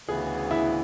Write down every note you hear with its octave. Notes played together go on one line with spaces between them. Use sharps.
D2 C#3 E3 B3 G#4
E4